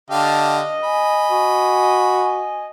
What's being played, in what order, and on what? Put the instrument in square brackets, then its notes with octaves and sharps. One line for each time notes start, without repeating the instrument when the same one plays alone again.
[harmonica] D3 G4 F5 [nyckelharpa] D#5 [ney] A5
[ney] G#5 [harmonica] B5
[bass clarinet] F#4